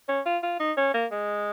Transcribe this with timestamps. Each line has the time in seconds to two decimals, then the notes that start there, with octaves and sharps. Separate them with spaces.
0.09 C#4
0.26 F4
0.43 F4
0.60 D#4
0.77 C#4
0.94 A#3
1.11 G#3